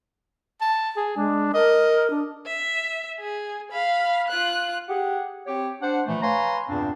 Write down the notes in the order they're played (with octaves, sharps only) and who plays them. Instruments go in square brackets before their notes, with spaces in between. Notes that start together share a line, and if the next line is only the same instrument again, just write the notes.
[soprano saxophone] A5
G#4
[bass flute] G#3 [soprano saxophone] D4
[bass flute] A#4 [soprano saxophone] D#5
[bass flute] D4
[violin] E5
G#4
F5 B5
F4 F#6
[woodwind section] G4 G#4 F#5
C4 G4 C#5
D4 C5 F#5
A#2 E3 F3 A3
B4 C#5 F5 G#5 A#5 C6
E2 G2 A#2 C#3 C4 D4